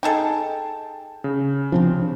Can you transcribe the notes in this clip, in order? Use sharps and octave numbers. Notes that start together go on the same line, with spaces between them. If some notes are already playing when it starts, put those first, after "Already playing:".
D#4 G#4 A4 G5 A5
C#3
C3 F3 C4 D4